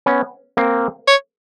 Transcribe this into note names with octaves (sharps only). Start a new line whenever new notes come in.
B3 C#4
A#3 C4
C#5